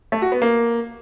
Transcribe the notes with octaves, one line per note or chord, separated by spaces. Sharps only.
A3
F#4
B3
A#3